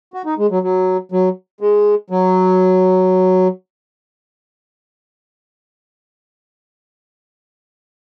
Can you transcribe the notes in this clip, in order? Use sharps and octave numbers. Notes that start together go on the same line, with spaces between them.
F#4
D#4
G#3
F#3
F#3
F#3
G#3
F#3